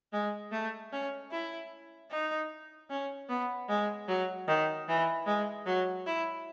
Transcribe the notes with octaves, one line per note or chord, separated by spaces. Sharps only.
G#3
A3
C#4
E4
D#4
C#4
B3
G#3
F#3
D#3
E3
G#3
F#3
E4